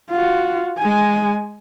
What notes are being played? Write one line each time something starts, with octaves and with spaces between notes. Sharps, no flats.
F4 F#4
G#3 G#5